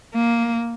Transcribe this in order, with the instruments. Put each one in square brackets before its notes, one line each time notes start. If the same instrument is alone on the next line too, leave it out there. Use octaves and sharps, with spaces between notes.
[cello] A#3